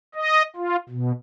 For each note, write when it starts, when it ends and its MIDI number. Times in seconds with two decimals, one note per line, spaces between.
0.15 0.42 75
0.56 0.76 65
0.89 1.12 47